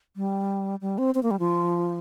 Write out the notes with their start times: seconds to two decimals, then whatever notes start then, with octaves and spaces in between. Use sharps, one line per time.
0.16 G3
0.81 G3
0.98 C4
1.15 C4
1.23 A#3
1.31 G3
1.39 F3